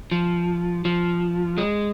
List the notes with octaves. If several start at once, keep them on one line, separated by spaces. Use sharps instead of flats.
F3
F3
G#3